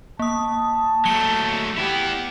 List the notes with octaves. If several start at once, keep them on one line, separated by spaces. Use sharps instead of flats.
A#3 A5 D#6
F#3 A3 C#7 G7
B3 E4 G4